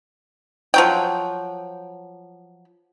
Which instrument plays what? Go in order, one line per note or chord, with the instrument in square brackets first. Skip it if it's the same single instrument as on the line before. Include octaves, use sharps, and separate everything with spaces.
[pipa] F3 F#3 G5